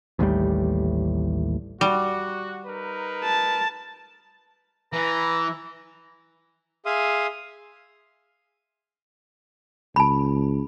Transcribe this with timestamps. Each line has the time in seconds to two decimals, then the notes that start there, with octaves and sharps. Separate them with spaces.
0.19 A1 D#2 A2 G3
1.81 G3 F#4
2.66 D#4 A#4 B4
3.24 A5
4.93 E3 B4 A#5
6.86 G#4 E5 F5 C6 D#6
9.96 C#2 A5 B5